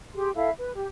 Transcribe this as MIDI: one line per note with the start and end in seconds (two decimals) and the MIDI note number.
0.14 0.30 67
0.14 0.30 68
0.14 0.30 84
0.35 0.50 64
0.35 0.50 69
0.35 0.50 76
0.35 0.50 77
0.57 0.72 71
0.76 0.88 67